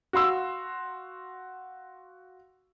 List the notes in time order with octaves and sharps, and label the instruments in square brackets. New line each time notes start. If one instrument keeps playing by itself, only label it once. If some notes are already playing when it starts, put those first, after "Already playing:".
[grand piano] F#4 F5 C6 E6